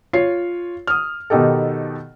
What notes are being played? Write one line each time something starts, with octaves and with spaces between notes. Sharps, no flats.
F4 C#5 C7
D#6 F6
B2 D#3 D#4 G4 A4